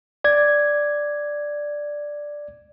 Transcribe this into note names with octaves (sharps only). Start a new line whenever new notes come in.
D5 G#6